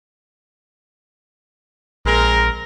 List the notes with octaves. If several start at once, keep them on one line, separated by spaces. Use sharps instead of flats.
A#1 G#3 C4 A#4